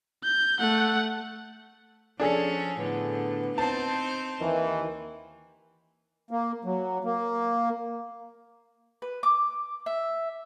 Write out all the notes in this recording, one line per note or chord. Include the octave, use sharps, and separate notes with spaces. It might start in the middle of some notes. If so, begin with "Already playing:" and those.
G6
A3 F#5
F3 C#4 D4 G#4 A4
A2 D3 B3
C4 D#4 C5 A5
D#2 D#3 E3
A#3
F#3
A#3
B4
D6
E5